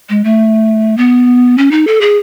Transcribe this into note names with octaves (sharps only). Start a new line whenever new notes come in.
G#3
A3
B3
C#4
D#4
A4
G#4